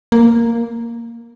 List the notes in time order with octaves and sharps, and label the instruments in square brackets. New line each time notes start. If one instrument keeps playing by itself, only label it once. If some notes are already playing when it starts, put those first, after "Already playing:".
[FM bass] A#3